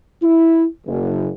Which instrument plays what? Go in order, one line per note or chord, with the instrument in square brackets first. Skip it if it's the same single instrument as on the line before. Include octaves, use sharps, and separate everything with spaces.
[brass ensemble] E4
F#1